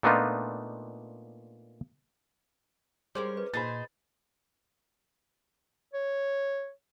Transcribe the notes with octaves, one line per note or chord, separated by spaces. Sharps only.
A#2 A3 B3 D4 D#4 F4
G3 G#3 C#4 A#4 C5 D6
B4 D#5
A#2 D#4 G#4 C5 B5 A6
C#5